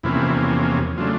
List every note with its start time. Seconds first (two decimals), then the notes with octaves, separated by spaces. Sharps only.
0.03 E2 C3 F3 A#3 C#4 E4
0.98 C#3 F#3 A3 D4 F4